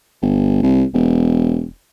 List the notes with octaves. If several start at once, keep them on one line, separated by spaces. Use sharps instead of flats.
G1
C2
E1